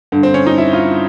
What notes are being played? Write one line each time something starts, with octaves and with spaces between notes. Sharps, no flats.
G2 D3
C4
C#4
D#4
E4
F4